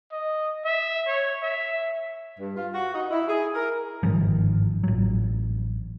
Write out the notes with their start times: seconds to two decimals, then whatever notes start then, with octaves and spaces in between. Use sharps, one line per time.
0.12 D#5
0.65 E5
1.07 C#5
1.43 E5
2.39 G2
2.56 F4
2.73 F#4
2.94 D#4
3.11 E4
3.28 G#4
3.54 A#4
4.03 G1 G#2 D#3 F3
4.83 A1 F#3